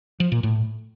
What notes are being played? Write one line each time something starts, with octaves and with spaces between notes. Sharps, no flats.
F3
A#2
A2